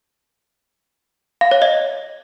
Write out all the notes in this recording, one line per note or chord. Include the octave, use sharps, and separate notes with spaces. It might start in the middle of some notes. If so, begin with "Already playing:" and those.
F5
C#5
D#5